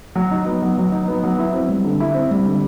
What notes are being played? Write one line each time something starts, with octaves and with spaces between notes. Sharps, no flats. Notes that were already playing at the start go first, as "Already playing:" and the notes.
F#3
D#4
B3
F#3
F#3
D#4
B3
F#3
E4
C4
G3
D3
E4
C4
G3
D3